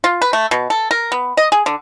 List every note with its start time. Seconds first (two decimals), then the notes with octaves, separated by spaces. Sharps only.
0.04 F4
0.21 B4
0.33 A3
0.51 B2
0.70 A4
0.91 A#4
1.12 B3
1.37 D#5
1.52 G#4
1.66 D3